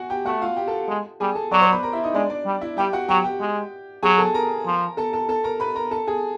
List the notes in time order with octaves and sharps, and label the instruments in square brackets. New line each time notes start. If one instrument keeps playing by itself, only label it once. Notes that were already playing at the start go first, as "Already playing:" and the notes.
Already playing: [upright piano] F#4 F#5 G#5
G4 G5
[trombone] A3 [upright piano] F#4 F#5
[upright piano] F4 F5
G4 G5
A4 A5
[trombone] G#3
[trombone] G3 [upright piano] G#4 G#5
[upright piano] A4 A5
[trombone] F#3 [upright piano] D5 D6
[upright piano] C5 C6
B4 B5
A#4 A#5
E4 E5
D#4 D#5
[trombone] G#3 [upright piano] D4 D5
[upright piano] D4 D5
[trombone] G3
[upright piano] E4 E5
[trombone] G3 [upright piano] G4 G5
[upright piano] F#4 F#5
[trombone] F#3 [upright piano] G4 G5
[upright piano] G4 G5
[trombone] G#3
[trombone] F#3 [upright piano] G#4 G#5
[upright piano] A4 A5
A#4 A#5
[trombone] F3
[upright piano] A4 A5
A4 A5
A4 A5
A#4 A#5
B4 B5
A#4 A#5
A4 A5
G#4 G#5